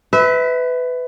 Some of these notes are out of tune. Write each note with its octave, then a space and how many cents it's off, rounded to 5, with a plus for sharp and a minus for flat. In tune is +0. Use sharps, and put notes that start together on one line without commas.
B4 +20 E5 -25